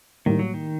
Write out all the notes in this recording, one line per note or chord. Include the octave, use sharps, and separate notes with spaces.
A2 D#3 G3 A#3
F#3
D#3